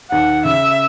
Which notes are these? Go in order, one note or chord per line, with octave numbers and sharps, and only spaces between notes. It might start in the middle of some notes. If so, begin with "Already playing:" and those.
D#2 D#3 F#5
C#3 E5